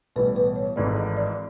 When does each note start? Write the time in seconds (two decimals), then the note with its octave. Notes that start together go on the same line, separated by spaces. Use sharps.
0.16 B1 A2 E3 G3 B4
0.36 B4
0.56 C#5
0.76 G#1 G#2 E3 A3 D5
0.97 D#5
1.17 D5